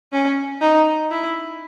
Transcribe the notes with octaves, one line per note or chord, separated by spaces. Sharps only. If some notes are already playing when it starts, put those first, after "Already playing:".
C#4
D#4
E4